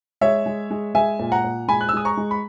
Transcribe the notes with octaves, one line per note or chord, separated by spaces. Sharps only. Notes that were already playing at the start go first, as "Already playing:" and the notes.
G#3 C#5 E5
G#3
G#3
G#3 E5 G#5
A#2
F#5 A#5
A#2
G#3 G#5 B5
F#6
E6
G#3 D#6
A#5 C#6
G#3
B5